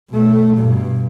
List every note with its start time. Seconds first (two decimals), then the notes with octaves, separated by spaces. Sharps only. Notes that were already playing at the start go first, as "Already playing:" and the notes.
0.11 B2 A3
0.54 G2 B2